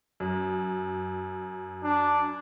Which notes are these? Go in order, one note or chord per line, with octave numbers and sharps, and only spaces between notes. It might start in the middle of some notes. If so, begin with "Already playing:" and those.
F#2
D4